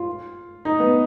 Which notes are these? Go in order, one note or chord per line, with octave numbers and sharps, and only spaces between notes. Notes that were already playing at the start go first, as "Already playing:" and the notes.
Already playing: F4
D#4
B3